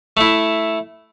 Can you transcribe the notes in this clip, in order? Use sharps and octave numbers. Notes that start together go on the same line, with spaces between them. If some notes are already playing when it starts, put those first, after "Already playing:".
A3 E4